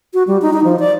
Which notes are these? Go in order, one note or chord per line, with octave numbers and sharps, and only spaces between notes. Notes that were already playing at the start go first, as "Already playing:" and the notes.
F#4
G3
D#4
D#4
F3
D5